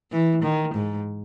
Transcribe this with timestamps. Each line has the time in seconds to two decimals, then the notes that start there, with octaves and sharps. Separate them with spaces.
0.12 E3
0.43 D#3
0.75 G#2